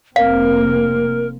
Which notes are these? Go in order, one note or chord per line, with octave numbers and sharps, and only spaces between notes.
F1 A#3 C4 A#4 F5